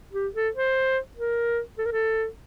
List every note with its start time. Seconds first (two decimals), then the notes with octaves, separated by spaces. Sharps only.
0.14 G4
0.35 A4
0.55 C5
1.17 A#4
1.78 A4
1.86 A#4
1.92 A4